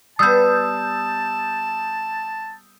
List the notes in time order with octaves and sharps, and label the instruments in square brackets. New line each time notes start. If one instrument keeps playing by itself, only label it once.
[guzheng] G3 B3 [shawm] A5 [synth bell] D#6 E6 G6